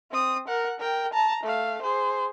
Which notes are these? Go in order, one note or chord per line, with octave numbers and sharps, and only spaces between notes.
C4 D#6
A#4 F#5
A#4 G5
A5 A#5
A3 F5
G#4 C5